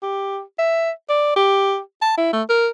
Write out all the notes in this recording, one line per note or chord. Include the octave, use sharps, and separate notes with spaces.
G4
E5
D5
G4
A5
E4
A3
A#4